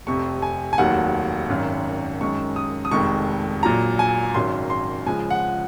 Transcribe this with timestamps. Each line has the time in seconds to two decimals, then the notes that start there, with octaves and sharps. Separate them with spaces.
0.06 F1 F2 C3 C#6
0.42 G#5
0.73 G#5
0.78 F1 D#2 D#3 F#3 F#5
1.49 G#1 F#2 D#3
2.21 F#2 D#3 G#3 C#6
2.56 D#6
2.85 D#6
2.91 F1 F2 D#3 G#3 C#6
3.63 A#1 A#2 F#3 A#5
3.99 G#5
4.34 G#1 F#2 D#3 F#3 C6
4.70 C6
5.06 C#2 C#3 F3 G#3 G#5
5.30 F#5